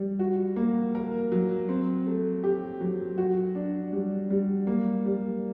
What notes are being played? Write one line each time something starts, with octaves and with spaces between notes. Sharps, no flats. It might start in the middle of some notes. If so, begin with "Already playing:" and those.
Already playing: G3
F#4
A#3
A#4
F#3
C4
A3
G4
F#3
F#4
D4
G3
G3
A#3
G3